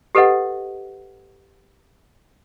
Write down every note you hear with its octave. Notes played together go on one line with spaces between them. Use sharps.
G4 A4 B4 D#5 F#5